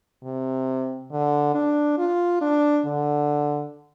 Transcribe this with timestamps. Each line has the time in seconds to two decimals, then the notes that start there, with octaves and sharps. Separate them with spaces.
0.24 C3
1.11 D3
1.55 D4
1.98 F4
2.41 D4
2.85 D3